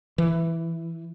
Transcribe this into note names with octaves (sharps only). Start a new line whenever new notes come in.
E3